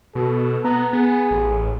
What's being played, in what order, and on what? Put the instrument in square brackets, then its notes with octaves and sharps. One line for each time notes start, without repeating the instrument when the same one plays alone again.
[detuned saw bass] B2 [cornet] A4
[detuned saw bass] B3 [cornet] A#5
[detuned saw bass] B3 [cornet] G#4
[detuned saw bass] A1